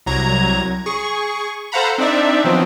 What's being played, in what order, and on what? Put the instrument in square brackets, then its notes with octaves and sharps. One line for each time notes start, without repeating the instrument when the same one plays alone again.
[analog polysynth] C2 F#3 A#5 G#6
G#4 C#6
A4 C5 F5 F#5 A#5 B5
C4 D4 D#4 D5 E5
D#3 F3 F#3 B3 C4